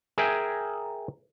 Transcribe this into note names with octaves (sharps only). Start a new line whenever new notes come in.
G#4 A#4 E5 G5 G#5